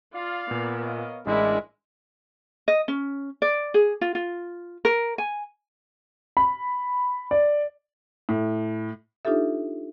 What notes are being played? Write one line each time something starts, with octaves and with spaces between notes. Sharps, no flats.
F4 D5 F5
A#2 B3 A#4
C#5 D#5 F5
A1 G#3 D4 E4 A#4
D#5
C#4
D5
G#4
F4
F4
A#4
G#5
B5
D5
A2
D4 D#4 F4 G4 A4 E5